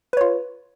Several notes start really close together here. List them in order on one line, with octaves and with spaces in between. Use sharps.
B4 C#5 F4